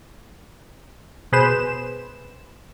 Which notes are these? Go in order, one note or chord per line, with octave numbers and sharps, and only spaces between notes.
B2 G#4 B4 C5 E7